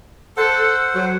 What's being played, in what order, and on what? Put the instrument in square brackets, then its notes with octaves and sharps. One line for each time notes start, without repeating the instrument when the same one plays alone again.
[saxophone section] A4 [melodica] C5 F#5
[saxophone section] F#3